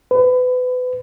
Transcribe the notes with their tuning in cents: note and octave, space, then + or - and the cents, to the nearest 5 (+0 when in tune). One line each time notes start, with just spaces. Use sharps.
B4 +30